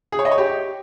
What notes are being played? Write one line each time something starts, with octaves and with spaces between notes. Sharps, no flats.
G#4
C#5
D#5
C#5
G4